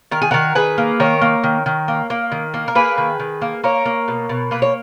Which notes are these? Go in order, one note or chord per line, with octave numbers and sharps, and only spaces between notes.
D#3 A#4
G#4
D#3 F#4 A#4
D#3 G#4 B4
A#3
D#3 A#4 C#5
A#3
D#3
D#3
A#3
A#3
D#3
A#3
A#4
A#3 G#4 B4
D#3
D#3
A#3
A#3 A#4 C#5
A#3
B2
B2
A#3 B4
C#5